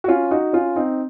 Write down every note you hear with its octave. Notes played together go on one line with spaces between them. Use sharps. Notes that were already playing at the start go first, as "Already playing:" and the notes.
F#4
C#4 F4
D#4 F#4
C#4 F4
C4 D#4